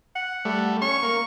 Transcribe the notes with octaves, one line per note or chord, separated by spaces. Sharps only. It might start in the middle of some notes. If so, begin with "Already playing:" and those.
F#5
G3 A3
C#4 C#6
A#3